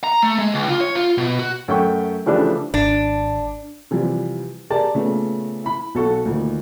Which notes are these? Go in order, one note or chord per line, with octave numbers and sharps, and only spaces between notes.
A#5
A3
G#3
C#2
F4
C#5
F4
B2
F#4
F#2 A3 G5 C#6
C#3 E3 F3 G3 A3 D4
G#1 D4
C3 E3 F3 G3
G4 G#4 A#4 D5 A5
A#2 C#3 A3 B3
E4 B5
B1 F#4 A4 C#6
D2 A#2 D#3